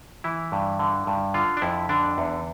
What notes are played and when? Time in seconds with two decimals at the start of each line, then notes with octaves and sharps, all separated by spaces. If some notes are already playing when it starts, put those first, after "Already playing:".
0.24 E3 E4
0.52 G2
0.79 D3
1.07 G2
1.34 D3 F4
1.57 D4
1.62 F2 E4
1.89 D3 D4
2.18 E2